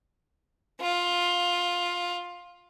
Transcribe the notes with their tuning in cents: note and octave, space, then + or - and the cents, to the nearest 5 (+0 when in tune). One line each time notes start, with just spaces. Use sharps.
F4 +15